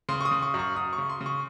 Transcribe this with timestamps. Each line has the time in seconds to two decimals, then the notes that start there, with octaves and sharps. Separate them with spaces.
0.09 C#3 C6
0.21 C#6
0.25 D#6
0.31 C#3
0.42 C#6
0.54 F#2
0.59 C#6
0.76 F#2 D#6
0.93 C#6
0.98 C#3
1.10 C6
1.21 C#3
1.26 C#6